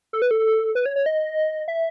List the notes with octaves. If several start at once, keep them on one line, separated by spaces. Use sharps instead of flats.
A4
B4
A4
B4
C#5
C#5
D#5
E5